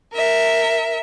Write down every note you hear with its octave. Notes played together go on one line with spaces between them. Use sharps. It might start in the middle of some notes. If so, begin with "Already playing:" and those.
A#4 E5